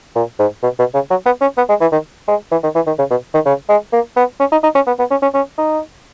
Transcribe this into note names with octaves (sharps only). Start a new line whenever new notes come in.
A#2
G#2
B2
B2
C#3
F#3
B3
C#4
B3
G#3
E3
D#3
G#3
E3
D#3
E3
D#3
C#3
B2
D#3
C#3
G#3
A#3
B3
C#4
D#4
D#4
C#4
B3
B3
C#4
C#4
C#4
D#4